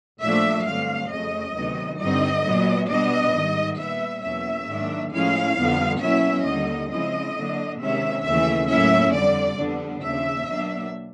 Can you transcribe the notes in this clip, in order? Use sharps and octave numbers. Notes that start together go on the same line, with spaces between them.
A#2 F3 A3 D4 E5
G2 D3 F#3 A3 C4 F5
F2 C#3 F#3 A3 D#5
D2 C3 D#3 F#3 B3
G2 D3 G3 C4 D#4 D#5
A#2 F#3 B3
B2 G3 B3 D4 D#5
G#2 D#3 G3
A#2 G3 B3 E5
E2 B2 F#3 A#3 C#4 E5
G#2 D#3 F#3 A#3 D4
A2 F3 G#3 C#4 E4 F5
F2 D3 G3 B3
B2 F#3 A#3 C#4 E4 E5
D#2 D3 G3 A#3 D#4 D#5
C#3 F3 G#3 C4 E4 D#5
D3 F#3 A#3 D4
C3 D#3 G#3 C#4 E5
D#2 C#3 E3 A3 E5
A2 F#3 A#3 C#4 E4 E5
F2 D3 G3 D5
F2 D3 G3 B3 D4
D#2 C#3 F3 A#3 D4 E5
B2 F#3 A#3 D4